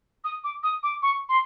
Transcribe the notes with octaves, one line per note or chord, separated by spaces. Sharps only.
D#6
D6
D#6
D6
C#6
C6